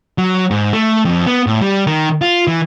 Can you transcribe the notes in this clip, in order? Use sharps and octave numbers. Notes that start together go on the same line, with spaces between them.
F#3
G#2
A3
F2
B3
A2
G3
D#3
F4
E3